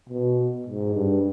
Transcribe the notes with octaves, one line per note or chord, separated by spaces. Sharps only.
B2
G#2
G2